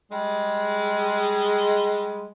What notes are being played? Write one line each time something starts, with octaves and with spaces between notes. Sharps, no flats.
G3 G#3